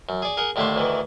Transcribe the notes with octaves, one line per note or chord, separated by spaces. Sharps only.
F#2
G#4 D5
G#4 A#4 F#5
D#2 A2 D3 A3 D4 C6
D2 D#3 E3